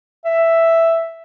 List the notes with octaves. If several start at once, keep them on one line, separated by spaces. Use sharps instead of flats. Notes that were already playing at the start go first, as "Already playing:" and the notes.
E5